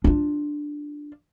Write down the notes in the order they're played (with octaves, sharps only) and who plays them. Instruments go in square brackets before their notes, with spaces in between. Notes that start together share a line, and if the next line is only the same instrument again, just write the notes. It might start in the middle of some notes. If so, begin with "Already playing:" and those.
[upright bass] D4 F4